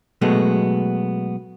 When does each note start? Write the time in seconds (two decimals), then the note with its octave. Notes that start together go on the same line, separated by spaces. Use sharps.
0.21 B2 F#3 G#3 A3 B3